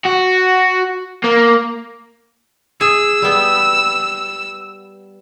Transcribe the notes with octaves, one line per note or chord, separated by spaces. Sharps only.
F#4
A#3
G#4 E6
G3 B3